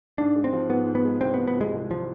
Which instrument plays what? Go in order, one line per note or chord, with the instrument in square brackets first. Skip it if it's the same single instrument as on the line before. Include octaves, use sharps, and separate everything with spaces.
[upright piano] G#2 [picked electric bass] D4
[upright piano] G#3
[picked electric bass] C4
[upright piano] F3
[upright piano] G#2 [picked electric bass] B3
[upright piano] G#2
[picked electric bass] B3
[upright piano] G#3
[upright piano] C2 [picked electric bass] C4
[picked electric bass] B3
[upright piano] F3
[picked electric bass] B3
[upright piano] C3 [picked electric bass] G#3
[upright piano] C2
[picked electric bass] F3